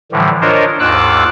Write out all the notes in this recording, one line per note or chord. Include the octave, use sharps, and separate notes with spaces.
A2 D3 E3 F3 G3
D4 F4 A#4 C5 C#5 D#5
D#2 G#2 F4 D6 E6 F#6